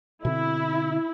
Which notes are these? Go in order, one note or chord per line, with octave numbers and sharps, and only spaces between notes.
B2 D3 C4 E4